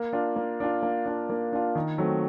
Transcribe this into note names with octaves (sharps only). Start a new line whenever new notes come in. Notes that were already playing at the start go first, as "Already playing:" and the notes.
Already playing: A#3
D4 F4
A#3
D4 F4
A#3
D4 F4
A#3
D4 F4
D#3
F#3 A3 C4